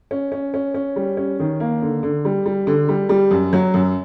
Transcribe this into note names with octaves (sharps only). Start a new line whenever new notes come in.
C#4
C#4
C#4
C#4
G3
C#4
D#3
A#3
D3
D3
G3
G3
D3
G3
G3
F#2
F#3
F#2